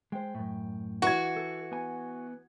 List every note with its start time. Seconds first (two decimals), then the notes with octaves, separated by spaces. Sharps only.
0.12 G#3 C5 G5
0.35 F#2 A2
1.02 E3 F#4 G#6
1.37 A4
1.72 B3 G#5